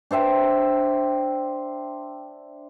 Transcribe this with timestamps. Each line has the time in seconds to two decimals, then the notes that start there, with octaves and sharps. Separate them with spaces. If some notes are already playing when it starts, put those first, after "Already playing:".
0.11 D4 C5 E5 G5